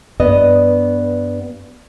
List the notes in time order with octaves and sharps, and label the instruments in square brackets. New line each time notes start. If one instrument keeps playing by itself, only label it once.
[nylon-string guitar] G2 B3 B4 D5 D#5